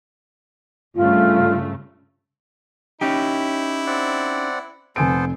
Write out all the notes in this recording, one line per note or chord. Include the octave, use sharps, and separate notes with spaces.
G2 C#3 A3 F4
C#4 D#4 E4 G4
C4 D5 F#5
F1 B3 A4 C5 G#5 D7